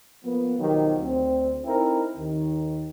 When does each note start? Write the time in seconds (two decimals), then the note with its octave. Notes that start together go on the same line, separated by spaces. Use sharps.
0.24 F3 A#3 B3
0.59 B1 D#3 F3 F#3 G4
1.00 D2 C4
1.65 C4 D#4 E4 A4 A#4
2.17 D#2 D#3